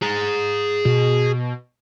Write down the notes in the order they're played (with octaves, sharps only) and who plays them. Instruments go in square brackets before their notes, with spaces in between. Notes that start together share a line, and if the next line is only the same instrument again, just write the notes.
[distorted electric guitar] G#4 A#5
[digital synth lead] B2